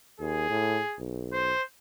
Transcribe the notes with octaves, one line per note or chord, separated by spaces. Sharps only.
D#2 G#4
A2
B1
C5